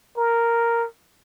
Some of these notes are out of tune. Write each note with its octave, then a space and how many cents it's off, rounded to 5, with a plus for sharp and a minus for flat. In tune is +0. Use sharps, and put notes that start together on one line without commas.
A#4 -5